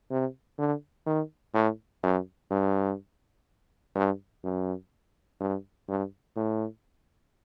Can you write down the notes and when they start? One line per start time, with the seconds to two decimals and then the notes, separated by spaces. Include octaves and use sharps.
0.11 C3
0.59 D3
1.06 D#3
1.54 A2
2.03 F#2
2.50 G2
3.95 G2
4.44 F#2
5.40 G2
5.88 G2
6.36 A2